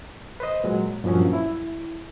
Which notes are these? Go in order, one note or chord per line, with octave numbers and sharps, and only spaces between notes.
B4 C5 D#5
A#2 F#3 G#3
G2 A#2 F3 F#3 C#4
E4